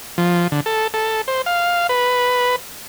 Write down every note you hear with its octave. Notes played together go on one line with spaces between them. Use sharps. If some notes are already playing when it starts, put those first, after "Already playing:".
F3
D3
A4
A4
C5
F5
B4